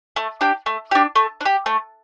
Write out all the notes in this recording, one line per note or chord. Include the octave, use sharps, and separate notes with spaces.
A3
D4 G4
A3
D4 G4
A3
D4
G4
A3